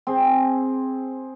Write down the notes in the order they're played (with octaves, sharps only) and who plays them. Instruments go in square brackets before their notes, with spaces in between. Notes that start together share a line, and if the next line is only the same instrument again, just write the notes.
[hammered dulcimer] C4 G#4